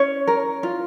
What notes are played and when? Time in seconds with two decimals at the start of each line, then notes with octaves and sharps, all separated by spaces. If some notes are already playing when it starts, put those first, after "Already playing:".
Already playing: C#4 C#5
0.27 A#4
0.63 F4